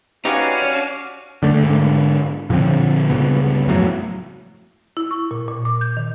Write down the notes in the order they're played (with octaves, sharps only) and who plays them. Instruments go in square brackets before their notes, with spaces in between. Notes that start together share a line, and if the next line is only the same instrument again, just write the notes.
[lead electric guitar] C#4 [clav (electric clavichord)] D#4 G4 B4 [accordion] F#4 D5 F5 [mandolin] C#5
[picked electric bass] D3 A3
G#2 D3
A#2 D3 F3 C4
C#2 G2 C#3 B3
F2 A2 F#3
[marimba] E4
C#6
A#2
A#2
D6
G6
D#3